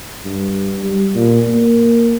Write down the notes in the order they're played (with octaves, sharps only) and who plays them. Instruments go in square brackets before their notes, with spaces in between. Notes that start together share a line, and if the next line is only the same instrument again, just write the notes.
[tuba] G2
G3
A#2
A#3